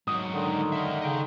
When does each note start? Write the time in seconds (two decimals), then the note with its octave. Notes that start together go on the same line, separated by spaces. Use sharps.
0.08 G#2 F#3 F#4 D#6
0.32 D3 D#3
0.73 A#4 E5
1.01 C#3 D#5 G5